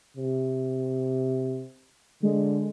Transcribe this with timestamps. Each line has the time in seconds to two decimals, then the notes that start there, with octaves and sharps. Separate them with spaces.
0.17 C3
2.23 D3 G#3